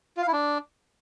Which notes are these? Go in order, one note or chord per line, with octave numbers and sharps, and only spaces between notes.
F4
F5
E4
D4